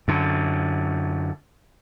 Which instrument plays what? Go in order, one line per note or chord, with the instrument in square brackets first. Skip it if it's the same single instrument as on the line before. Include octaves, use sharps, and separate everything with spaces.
[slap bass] F#2 D3